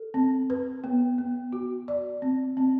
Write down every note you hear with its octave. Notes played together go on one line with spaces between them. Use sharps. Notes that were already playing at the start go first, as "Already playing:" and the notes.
Already playing: A4
C4
B4
B3
B3
F#4
D5
C4
C4